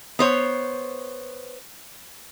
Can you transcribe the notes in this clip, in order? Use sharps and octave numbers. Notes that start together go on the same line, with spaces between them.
B3 C5 C#5